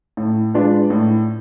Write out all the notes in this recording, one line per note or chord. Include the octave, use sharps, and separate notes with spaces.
A2
G#3 D4 F4 B4
A2